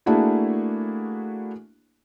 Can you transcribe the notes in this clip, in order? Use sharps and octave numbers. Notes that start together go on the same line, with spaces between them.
A3 A#3 D4 E4 F#4 G#4